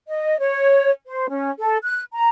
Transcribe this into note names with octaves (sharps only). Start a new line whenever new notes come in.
D#5
C#5
C5
C#4
A4
F#6
A#5